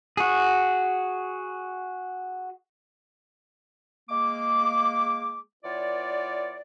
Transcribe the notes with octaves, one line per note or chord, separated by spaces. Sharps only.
F#4 G#4
G#3 A#3 D6
E3 B3 F4 C#5 D5